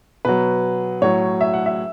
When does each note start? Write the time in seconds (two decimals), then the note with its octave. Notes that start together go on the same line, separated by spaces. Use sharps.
0.25 B2 F#3 B4
1.02 A2 F#3 C#5
1.41 E5
1.53 F#5
1.66 E5